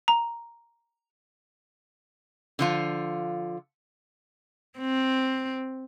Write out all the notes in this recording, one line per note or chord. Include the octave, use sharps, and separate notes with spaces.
A#5
D3 F3 F4
C4